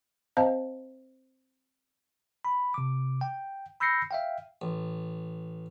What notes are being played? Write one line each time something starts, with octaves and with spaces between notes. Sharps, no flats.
C4 C5 D#5 F5 A5 A#5
B5
C3 D6
G5
B5 E6 G6 A#6 C7 C#7
E5 F5 G5
A1